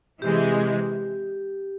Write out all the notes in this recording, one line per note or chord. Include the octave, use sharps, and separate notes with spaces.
C3 E3 G#3 G4